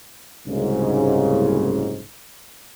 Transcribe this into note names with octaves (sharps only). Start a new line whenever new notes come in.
F#1 C2 G#2 C#3